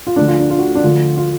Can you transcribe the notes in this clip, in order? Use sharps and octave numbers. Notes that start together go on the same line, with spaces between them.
F4
D2 D3 F3 A3 D4
F4
D4
F4
F#4
D4
D2 D3 F3 A3 F4
F4